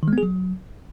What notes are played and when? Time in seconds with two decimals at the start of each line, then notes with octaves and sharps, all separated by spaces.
0.03 D#3
0.08 G#3
0.13 B3
0.18 G#4
0.23 F#3